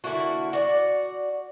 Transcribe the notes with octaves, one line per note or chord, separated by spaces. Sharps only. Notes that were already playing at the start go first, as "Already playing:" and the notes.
D3 A#3 E4 F#4
F#4 D5